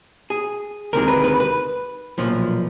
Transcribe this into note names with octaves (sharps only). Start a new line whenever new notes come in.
G#4
D2 C3 D#3 G#3 A#4
B4
B4
B4
B1 A#2 F3